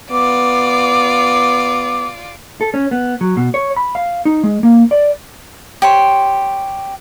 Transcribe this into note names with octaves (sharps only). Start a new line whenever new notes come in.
B3 F4 D5 D6
A4
C#4
B3
F#3
B2
C#5
B5
F5
D#4
G#3
A#3
D5
G4 C#5 C6